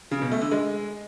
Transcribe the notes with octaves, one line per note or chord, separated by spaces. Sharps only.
C#3
B2
A3
D3
G#3